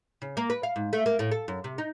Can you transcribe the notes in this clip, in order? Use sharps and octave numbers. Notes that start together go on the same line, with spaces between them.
C#3
A#3
B4
F5
G#2
A3
A#3
A2
A4
F#2
C3
D#4